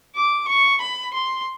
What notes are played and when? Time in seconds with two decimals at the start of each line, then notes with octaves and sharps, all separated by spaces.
0.15 D6
0.48 C#6
0.81 B5
1.14 C6